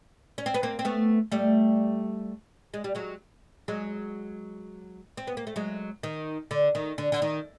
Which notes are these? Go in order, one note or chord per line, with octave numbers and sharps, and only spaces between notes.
C#4
C4
B3
A#3 C4
C4
A3 B3
G3 A3
G#3
G3
F#3 G#3
F#3 G#3
C4
B3
A#3
A3
F#3 G#3
D#3
D3
D#3
D3
D3
D#3